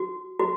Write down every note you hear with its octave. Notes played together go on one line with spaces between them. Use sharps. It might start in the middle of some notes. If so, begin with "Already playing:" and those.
Already playing: F#4
F#4